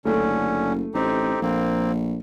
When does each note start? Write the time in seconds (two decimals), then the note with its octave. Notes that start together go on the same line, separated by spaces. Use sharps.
0.05 F#1 D3 A3 C#4
0.94 A1 C4 D#4 G4
1.42 A#1 A#3 C4